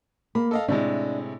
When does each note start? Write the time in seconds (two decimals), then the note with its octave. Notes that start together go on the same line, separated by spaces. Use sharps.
0.35 A#3 B5
0.51 A4 D#5 F5
0.68 A2 C3 G#3 D4